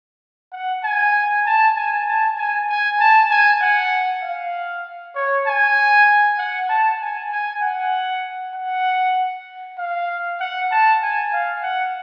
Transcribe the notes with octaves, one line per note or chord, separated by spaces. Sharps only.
F#5
G#5
A5
G#5
A5
G#5
G#5
A5
G#5
F#5
F5
C#5
G#5
F#5
A5
G#5
G#5
F#5
F#5
F5
F#5
A5
G#5
F5
F#5